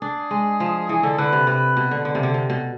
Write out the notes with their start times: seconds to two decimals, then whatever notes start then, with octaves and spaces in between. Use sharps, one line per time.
0.02 D4 G#4
0.31 G#3
0.60 F3
0.89 E3 G#4
1.03 D3 A4
1.18 D3 B4
1.32 C3
1.47 C3 B4
1.77 B2
1.91 D3
2.05 D3
2.15 C3
2.23 D3
2.34 C3
2.50 B2